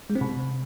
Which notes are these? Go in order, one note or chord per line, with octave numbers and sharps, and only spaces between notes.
G#3
C4
C3